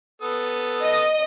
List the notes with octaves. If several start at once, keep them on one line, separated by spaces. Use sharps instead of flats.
B3 A4 D#6
D#5